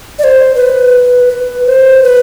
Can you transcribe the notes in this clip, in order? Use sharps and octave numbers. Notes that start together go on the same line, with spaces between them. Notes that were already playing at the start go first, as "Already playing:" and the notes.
D5
C5
B4
B4
C5
B4